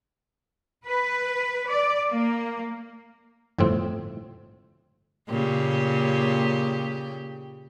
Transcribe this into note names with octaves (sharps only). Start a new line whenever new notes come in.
B4
D5
A#3
G1 F2 A2 C4
A#2 C#3 G4